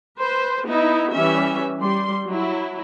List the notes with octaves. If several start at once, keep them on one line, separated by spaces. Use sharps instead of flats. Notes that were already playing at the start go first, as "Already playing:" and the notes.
B4 C5
B3 D#4 E4
E3 G3 C#4 E5
G3 C6
F#3 E4